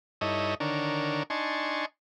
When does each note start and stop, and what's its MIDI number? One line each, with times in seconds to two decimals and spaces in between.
0.21 0.55 43
0.21 0.55 63
0.21 0.55 64
0.21 0.55 69
0.21 0.55 73
0.21 0.55 75
0.60 1.23 50
0.60 1.23 51
0.60 1.23 62
0.60 1.23 70
0.60 1.23 73
1.30 1.86 62
1.30 1.86 63
1.30 1.86 80
1.30 1.86 81
1.30 1.86 84
1.30 1.86 85